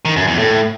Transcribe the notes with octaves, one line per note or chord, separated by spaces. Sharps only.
D#3
F#2
E2
A2